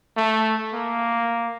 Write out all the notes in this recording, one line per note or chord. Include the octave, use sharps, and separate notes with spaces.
A3
A#3